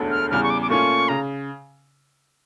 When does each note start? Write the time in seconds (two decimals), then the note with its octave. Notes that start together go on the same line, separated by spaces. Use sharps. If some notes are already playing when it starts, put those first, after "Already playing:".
Already playing: E1 D2 D3 A3
0.11 F6
0.30 E2 C#3 G3 F6
0.43 C#6
0.50 D6
0.62 D6
0.69 A#2 A3 C#4 F4 C#6
1.09 C#3 A#5